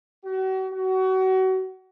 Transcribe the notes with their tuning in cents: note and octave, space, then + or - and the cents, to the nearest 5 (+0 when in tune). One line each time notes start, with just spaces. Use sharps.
F#4 +40
F#4 +30